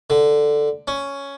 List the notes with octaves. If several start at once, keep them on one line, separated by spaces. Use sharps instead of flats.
D3
C#4